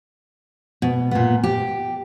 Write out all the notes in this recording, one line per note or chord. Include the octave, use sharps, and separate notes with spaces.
B2
A#2 B3
G4